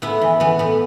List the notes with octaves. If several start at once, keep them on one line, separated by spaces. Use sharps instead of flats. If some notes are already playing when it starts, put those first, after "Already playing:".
A2 B3 E4
E3
E3 B3
A2 B3